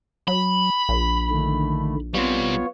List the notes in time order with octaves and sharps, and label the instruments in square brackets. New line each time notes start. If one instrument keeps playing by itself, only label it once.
[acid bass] F#3 [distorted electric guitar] B5
[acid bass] A#1
[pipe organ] D3 D#3 A3
[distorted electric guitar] G3 C4 [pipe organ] B3 F4 C#5